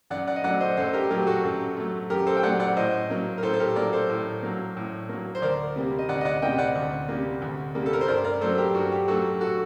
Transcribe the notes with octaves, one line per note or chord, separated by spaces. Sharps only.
F#2 D5 F#5
D5 F#5
D#5
F#3 A3 D5 F#5
C5 D#5
F#2 A4 C5
G4 A#4
F#3 A3 G4 A#4
F#4 A4
F#2
F#3 A3
F#2 G4 A#4
A4 C5
G5
F#3 A3 D5 F#5
D5 F#5
A2 C5 D#5
F#3 A#3
A#4
A2 A4 C5
A4
G4 A#4
F#3 A#3 A#4 D5
A4 C5
A2
F#3 A#3
A2
F#3 A#3
C5
D2 A#4 D5
C3 G3 A#3
D#5
D2 D5 F#5
D#5
D5 F#5
C3 G3 A#3 D#5 G5
D5 F#5
D2
C3 G3 A#3
D2
C3 G3 A#3
A4
A#4
C5
G2 A#4 D5
A#4 D5
F#3 A3 A4 C5
G4 A#4
G2 F#4
G4
F#3 A3 F#4 A4
F#4 A4